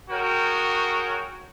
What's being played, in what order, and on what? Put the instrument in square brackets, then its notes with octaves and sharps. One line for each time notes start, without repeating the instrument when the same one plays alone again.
[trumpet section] F#4 G#4 A#4 C#5 G5